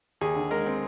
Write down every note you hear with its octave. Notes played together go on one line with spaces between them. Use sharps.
D#2 G#4
D3
G#3 A#4
C4